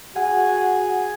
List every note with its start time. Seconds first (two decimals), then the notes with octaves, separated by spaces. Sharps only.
0.16 F#4 G#4 F#5